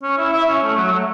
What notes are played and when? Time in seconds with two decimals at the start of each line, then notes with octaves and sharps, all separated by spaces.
0.03 C#4
0.18 E4
0.33 E4
0.48 C#4
0.63 A3
0.77 F#3
0.92 A3